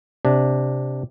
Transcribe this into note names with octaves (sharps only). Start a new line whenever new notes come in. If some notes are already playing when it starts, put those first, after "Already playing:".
C3 D4